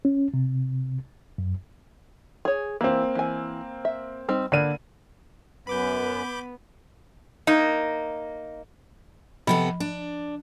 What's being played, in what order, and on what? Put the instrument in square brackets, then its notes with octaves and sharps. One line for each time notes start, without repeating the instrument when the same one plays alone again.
[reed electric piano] C#4
C3
F#2
[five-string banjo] G#4 C#5
[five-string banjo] E3 [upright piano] A#3 C4
[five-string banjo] E3 G#5
E5
G3 C4 D#4
[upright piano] D3 D#7 [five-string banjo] A#3 D5 B5
[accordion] F#2 [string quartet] B3 [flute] B4 [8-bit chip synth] B5 D6 G6
[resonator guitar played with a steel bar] A#3 D#4
[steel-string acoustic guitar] C3 B3 A4 [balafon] F3 B5
[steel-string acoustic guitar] D4